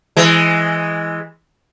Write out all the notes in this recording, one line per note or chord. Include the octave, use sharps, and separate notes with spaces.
E3 G#3